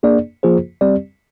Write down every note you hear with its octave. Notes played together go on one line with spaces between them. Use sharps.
A#3 D4 G#4 D5
F3 A#3 F4 G#4 C5
G3 C4 G4 D5